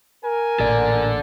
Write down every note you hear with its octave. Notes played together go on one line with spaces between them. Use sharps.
A#4 G#5
A1 A#2 A4 D5